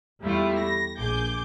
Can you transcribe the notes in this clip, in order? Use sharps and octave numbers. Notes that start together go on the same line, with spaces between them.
E2 G3 A3 E4 F4
A#6
A#1 G#4 D6 G6